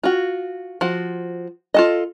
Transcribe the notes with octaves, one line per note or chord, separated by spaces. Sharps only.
F4 F#4
F3 F#4
F4 A4 D#5